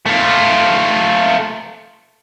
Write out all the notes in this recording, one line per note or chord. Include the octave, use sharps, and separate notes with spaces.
A3 F4